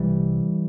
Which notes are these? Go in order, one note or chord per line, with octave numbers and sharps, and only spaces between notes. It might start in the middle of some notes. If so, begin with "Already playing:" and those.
Already playing: C2 C3 E3 G3